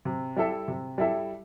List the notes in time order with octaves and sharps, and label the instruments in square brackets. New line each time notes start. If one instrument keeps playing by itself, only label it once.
[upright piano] C3
G3 E4 A4 E5
C3
G3 E4 A4 E5